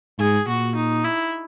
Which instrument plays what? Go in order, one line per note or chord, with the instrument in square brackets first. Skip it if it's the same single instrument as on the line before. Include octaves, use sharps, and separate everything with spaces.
[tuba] G#2 [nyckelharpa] G#4
[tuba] A#2 [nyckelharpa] F#4
[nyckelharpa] D#4
E4